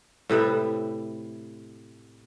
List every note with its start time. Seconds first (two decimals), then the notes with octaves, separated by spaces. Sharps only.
0.29 A2 C3 B4 E5